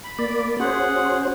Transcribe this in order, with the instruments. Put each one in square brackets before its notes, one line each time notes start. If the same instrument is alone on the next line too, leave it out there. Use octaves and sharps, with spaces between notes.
[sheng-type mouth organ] B5
[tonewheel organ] A#3 D5
[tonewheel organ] C#4 F#4 C5 [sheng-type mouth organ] G#4 F#5